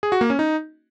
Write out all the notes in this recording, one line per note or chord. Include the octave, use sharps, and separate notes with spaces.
G#4
F#4
A#3
C#4
D#4